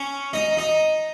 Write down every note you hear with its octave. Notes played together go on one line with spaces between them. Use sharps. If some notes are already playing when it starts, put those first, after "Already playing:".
Already playing: C#4 C#5
D#4 D#5
D#4 D#5